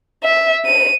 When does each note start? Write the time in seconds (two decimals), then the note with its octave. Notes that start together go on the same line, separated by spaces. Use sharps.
0.24 E5
0.66 D#7